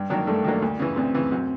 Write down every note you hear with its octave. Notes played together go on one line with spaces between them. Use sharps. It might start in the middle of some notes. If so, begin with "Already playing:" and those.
Already playing: G2
D#3 F#3 A#3 D4
G2 A3
D#3 F#3 A#3 D4
D2
C#3 E3
D2 C4
C#3 E3
F#2